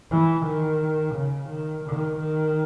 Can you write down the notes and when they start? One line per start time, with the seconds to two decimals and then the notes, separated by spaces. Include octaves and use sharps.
0.12 E3
0.46 D#3
1.15 C#3
1.50 D#3
1.85 D#3
2.19 D#3